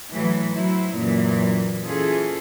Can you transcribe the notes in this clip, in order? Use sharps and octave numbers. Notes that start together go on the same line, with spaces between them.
A2 E3 F#3
F#3 E4 C5
F#2 A#2 E3
E3 C#4 F4 G#4 A4